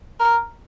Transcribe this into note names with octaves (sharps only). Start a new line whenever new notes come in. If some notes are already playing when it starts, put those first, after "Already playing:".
A#4